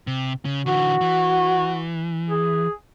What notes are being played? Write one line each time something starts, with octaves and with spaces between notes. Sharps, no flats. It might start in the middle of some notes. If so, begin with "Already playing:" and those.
C3
C#3
D3 E3 F#4
E3
G#4